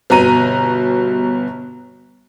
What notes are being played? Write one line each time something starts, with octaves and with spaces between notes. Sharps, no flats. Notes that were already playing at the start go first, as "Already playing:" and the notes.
G1 B2 A#5 D#7